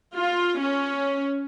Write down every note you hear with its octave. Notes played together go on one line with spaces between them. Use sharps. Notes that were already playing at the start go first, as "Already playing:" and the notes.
F4
C#4